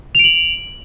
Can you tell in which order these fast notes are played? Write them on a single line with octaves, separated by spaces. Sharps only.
F7 D7 F#7